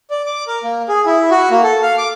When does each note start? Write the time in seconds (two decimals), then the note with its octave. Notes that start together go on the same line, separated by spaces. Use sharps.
0.10 D5
0.26 D6
0.47 A#4
0.63 A#3
0.89 G#4
1.06 E4
1.31 F#4
1.51 A#3
1.63 A4
1.83 F5
1.98 D6